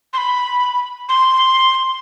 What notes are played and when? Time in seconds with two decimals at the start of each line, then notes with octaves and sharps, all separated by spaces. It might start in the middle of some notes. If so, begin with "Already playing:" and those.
0.13 C6
0.18 B5
1.09 C6